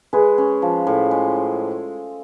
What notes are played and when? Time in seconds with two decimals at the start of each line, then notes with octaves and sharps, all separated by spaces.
0.13 G#3 G#4 B4
0.38 C#4
0.62 F3
0.87 A2
1.11 G#3